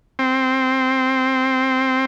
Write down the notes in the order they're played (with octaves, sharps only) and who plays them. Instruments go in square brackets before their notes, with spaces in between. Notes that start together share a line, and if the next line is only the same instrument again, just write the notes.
[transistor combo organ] C4